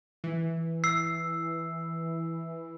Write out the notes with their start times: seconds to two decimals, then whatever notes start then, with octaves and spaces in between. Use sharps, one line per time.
0.24 E3
0.84 E6 C7